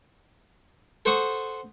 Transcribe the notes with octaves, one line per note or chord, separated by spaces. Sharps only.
A4 C5 F#5 C#6 D#6